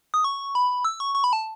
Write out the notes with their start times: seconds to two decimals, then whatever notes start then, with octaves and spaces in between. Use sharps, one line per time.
0.14 D#6
0.24 C#6
0.55 B5
0.85 E6
1.00 C#6
1.15 C#6
1.24 B5
1.33 A5